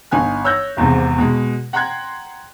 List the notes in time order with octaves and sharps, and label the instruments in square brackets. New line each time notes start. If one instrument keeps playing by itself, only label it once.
[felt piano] G1 D#4 G#5 F#6
C#5 E6 F#6 G6 A#6
G#1 E2 G#2 C3
B2 G#3
F#5 G5 A#5 C6 F#6 G#6